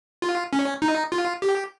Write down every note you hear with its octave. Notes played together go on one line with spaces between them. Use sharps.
F4
C#4
D#4
F4
G4